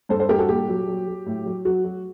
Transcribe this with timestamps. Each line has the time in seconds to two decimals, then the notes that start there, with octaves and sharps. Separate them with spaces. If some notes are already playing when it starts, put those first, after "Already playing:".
0.09 G2 A4 C5
0.19 A4 C5
0.29 G2 G4 A#4
0.39 F#4 A4
0.49 A#2 G4
0.68 F#3
0.87 F#3
1.07 F#3
1.26 A2
1.46 F#3
1.65 F#3 F#4
1.84 F#3